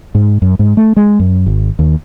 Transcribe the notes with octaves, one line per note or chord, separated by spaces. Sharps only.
G#2
F#2
G#2
A3
G#3
F#2
G#1
D#2